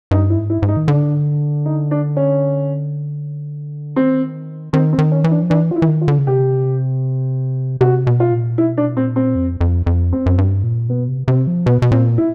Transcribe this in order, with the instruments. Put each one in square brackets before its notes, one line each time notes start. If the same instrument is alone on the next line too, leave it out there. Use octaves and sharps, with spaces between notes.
[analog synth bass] G2 [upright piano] D#4
[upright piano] E4
[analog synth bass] G#2
[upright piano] E4
[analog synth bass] G#2
[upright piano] D#4
[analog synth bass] D#3
[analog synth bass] D3 [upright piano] D4
[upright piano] D#4
D4
C#4
[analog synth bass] D#3 [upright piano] C4
[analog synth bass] D#3 [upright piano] C4
[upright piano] C4
[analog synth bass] D#3
[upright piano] C#4
[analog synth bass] E3
[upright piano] D4
[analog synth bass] F3
[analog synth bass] E3 [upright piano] D4
[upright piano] F4
E4
[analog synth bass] E3
D#3
[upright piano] F4
[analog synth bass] D3
C#3
[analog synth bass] C3 [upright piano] G4
[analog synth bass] C3 [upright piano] F#4
[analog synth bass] B2
[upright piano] F4
[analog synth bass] A#2
[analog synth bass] B2 [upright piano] E4
[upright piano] D4
[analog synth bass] A#2 [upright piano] C4
[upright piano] C4
[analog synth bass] F2
F2
F2
[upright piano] C4
[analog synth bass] F#2
G2
A#2
[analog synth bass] B2 [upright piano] B3
[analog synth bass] C3
[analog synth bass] C3 [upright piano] C4
[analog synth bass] F3
[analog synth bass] B2 [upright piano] B3
[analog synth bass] B2
[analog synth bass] A#2 [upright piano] C4
[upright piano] E4